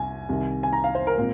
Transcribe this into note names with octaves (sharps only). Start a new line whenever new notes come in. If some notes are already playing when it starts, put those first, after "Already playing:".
Already playing: C2 G#5
C2 C3 D#3
G#5
A#5
F5
C5
A#4
A#2 G#3 C4